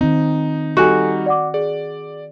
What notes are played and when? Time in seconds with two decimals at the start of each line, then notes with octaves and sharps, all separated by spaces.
0.01 D#3 C4 D#4
0.77 G3 D#4 F#4 G4 A4 G#5
1.26 D5 F#5 D6
1.54 G#4 D5